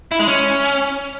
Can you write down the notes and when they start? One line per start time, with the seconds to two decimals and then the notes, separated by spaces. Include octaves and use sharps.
0.12 E4
0.20 G#3
0.28 C#4